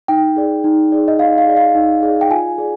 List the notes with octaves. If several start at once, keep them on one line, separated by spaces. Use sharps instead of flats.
D#4 G5
G#4 D5
D#4
G#4 D5
D#5
D#4 F5
F5
G#4 D5
F5
D#4
G#4 D5
G5
F4 G#5
G#4 D5